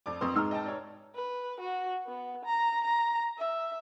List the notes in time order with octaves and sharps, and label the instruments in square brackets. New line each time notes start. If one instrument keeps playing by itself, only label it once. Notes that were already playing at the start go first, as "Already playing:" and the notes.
[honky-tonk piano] F2 D5 D6
[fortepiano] F2 D#6 [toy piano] B4 [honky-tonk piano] C6 C#6
[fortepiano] G#2 E6 F6 [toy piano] D#4 A#5
[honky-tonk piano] D#5 G5 A5
C#5 D5
[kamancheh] B4
F#4
B3
A#5
A#5
E5